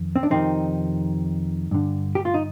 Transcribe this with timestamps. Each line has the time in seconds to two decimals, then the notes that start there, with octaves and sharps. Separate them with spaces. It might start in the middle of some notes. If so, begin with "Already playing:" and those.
Already playing: F2 D#3
0.16 C4
0.23 D4
0.30 F2 C3 D#3 C4 D#4
1.71 G2 D3
2.15 G4
2.25 F4
2.34 D#4